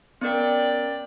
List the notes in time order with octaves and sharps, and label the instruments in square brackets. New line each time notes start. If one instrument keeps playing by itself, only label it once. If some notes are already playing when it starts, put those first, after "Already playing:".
[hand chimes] B3 C#4 A#4 [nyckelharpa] D5 G5